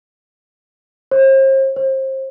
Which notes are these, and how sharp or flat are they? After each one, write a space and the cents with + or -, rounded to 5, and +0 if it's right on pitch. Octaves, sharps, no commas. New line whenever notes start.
C5 +40
C5 +30